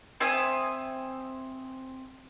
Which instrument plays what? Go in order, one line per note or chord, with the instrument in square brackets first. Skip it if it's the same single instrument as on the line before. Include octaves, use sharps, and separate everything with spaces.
[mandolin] C4 E5 G#5 D#6